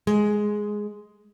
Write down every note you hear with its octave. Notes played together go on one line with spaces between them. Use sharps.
G#3